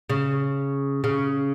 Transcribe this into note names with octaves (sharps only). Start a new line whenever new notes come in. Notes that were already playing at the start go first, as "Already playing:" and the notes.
C#3
C#3